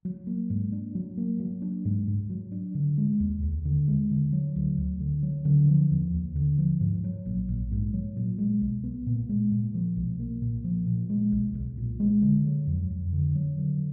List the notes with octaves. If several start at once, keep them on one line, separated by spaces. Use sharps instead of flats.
F#3
A#3
G#2
D4
F#3
A#3
F#3
D4
G#2
G#2
F#3
D4
D3
G#3
D#2
D#2
D3
G#3
D3
F#3
D2
D2
D3
F#3
D3
F3
D#2
D#2
D3
F3
G#2
F#3
A#1
A#1
G#2
F#3
A#2
G#3
B1
B3
A#2
G#3
A#2
F3
B1
A#3
A#2
F3
A#2
G#3
B1
B1
A#2
G#3
D3
F#3
F2
F2
D3
F#3
D3